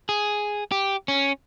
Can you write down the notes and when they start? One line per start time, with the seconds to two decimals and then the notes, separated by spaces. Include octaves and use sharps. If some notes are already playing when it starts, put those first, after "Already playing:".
0.09 G#4
0.72 G4
1.08 C#4